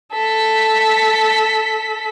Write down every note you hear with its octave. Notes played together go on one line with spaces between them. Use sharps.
A4 B6